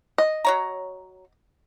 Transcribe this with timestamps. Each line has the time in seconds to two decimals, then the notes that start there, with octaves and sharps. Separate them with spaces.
0.18 D#5
0.45 F#3 C#5 A#5